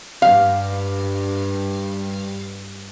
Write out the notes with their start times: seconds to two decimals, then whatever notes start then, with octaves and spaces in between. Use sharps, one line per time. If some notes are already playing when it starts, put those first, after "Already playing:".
0.22 G2 F5